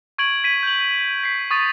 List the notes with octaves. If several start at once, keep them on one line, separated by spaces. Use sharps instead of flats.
C#6 G#6 D7 F#7
G#6 B6 D#7
G6 F#7
B6 C7
C#6 D#6 A6 D#7